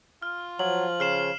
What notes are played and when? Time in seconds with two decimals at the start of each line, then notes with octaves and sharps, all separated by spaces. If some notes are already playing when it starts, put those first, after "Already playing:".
0.22 F4 F6
0.59 F3 F#3 F#7
1.00 C#3 F6 C7 E7